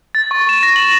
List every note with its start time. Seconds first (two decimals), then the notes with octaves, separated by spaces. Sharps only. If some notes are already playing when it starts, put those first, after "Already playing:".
0.15 A6
0.31 C#6
0.49 E7
0.63 A#6
0.76 F#7